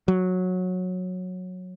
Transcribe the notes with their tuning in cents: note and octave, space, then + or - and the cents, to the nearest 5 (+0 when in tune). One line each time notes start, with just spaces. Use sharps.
F#3 -15